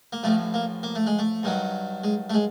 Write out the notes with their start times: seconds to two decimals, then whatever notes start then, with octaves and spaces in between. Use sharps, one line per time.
0.13 A#3
0.23 A1 A2 F3 A3
0.54 A#3
0.83 A#3
0.95 A3
1.07 G#3
1.19 A3
1.43 G2 D#3 F#3
2.04 G#3
2.30 A3
2.34 G#3